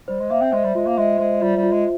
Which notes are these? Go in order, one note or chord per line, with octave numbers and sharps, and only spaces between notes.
G3 C5
G#3
A#3 E5
C4
G#3 C5
G3
G#3 F4
A#3
G#3 E5
G#3 C5
G3 F4
G3
F4
G#3